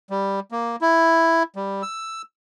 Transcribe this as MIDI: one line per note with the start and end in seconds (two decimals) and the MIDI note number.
0.10 0.40 55
0.52 0.76 58
0.81 1.43 64
1.56 1.82 55
1.83 2.22 88